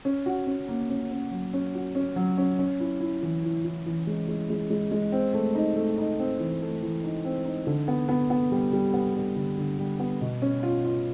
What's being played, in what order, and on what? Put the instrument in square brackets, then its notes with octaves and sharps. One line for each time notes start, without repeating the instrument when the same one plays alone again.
[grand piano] C#4
F#4
C#4
A#3
C#4
C#4
F#3
C#4
F#4
C#4
F#3
C#4
C#4
E4
E4
E3
E4
E4
E3
G#3
G#3
G#3
G#3
G#3
C4
A3
D#4
A3
D#4
C4
E3
A3
E3
D#4
C4
D#4
D3
B3
B3
B3
G3
G3
B3
G3
D3
D3
G3
B3
B2
C#4
F4
F4